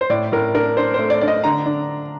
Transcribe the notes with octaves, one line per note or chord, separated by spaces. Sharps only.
C5
A2 D5
A2 A#4
D4 A#4
D4 C5
A3 C5
D5
D4 D5
D#5
D3 A#5
D4